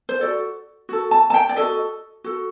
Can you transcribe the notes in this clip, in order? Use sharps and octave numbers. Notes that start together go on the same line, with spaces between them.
C5
F#4 A4 D5
F#4 A4
A5
A5
G5
D5
F#4 A4 D#5
F#4 A4